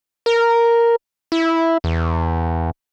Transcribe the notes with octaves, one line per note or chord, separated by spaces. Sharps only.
A#4
E4
E2